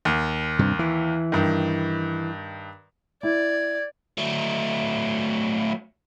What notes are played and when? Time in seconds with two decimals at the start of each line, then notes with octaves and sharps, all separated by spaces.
0.05 D#2
0.59 G2 C3
0.79 E3
1.32 G2 D#3
3.23 E4 D5 G#6
4.18 F#3 A3